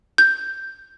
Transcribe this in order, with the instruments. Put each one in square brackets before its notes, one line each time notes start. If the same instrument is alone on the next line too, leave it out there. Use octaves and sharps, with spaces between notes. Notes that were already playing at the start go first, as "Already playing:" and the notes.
[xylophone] G6